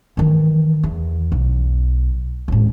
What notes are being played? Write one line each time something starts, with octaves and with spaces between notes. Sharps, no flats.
D#3 E3
E2
B1
A1 G#2